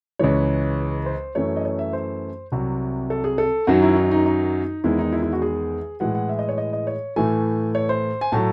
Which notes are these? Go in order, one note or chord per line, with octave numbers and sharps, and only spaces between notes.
C#2 C#3 E3 G#3 C#5
C5
F#2 E3 A3 C#5
D#5
C#5
E5
C5
C2 C3 F#3
A4
G#4
A4
F#2 D#3 F#3 F#4
E4
D#4
D#4
D#4
E2 D#3 G#3 E4
D#4
E4
E4
F#4
G#4
A2 E3 G#3 F#5
F#5
E5
D#5
C#5
D#5
D#5
C#5
A2 E3 A3 G#5
C#5
C5
G#5
A2 F#3 A3 A5